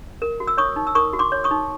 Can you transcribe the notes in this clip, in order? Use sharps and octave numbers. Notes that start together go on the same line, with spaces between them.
A#4
F#4
E6
C#5 C#6 D#6
D#4
E6
A#4 C#6 D#6
F#4
C6 D6
C#5
C#6 D#6
D#4